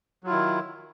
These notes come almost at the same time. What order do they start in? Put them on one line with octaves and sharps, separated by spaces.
F#3 F4 E4 D#3